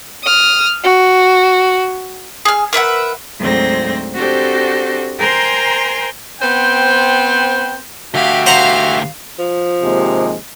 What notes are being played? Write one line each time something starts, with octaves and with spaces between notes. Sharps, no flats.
D#6 F6
F#4
G#4 F6
A#4 B4 E5 F#5
D2 G#2 F#3 C4 C5 A#6
C4 D4 F#4 G4 A4 C5
A#4 C5 G5 G#5 A#5 C6
B3 C4 C5 G5
D2 F#4 G4 E5 F5
C5 F5 F#5 A#5
F3
D#2 C3 G#3